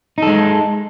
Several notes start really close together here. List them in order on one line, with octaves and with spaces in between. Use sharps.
D#4 A4 G#3